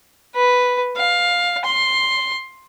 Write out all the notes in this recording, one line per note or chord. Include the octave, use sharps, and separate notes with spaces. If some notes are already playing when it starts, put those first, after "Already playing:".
B4
F5
C6